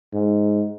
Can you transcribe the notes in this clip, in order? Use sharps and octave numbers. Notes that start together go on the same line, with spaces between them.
G#2